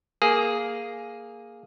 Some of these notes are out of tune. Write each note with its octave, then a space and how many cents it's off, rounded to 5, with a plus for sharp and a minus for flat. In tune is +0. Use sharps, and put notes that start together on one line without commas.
A#3 +0 G#4 +0